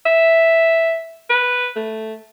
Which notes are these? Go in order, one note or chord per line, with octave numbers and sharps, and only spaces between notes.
E5
B4
A3